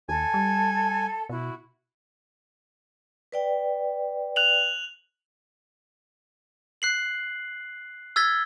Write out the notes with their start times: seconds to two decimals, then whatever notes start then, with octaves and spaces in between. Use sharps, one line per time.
0.09 D#2 A4 G#5 A5
0.34 G3
1.29 B2 E4 F#4
3.32 B4 D5 G5
4.36 F#6 F7 F#7
6.82 F#6 C7 F#7
8.16 E6 F6 G#6 A6 B6 G7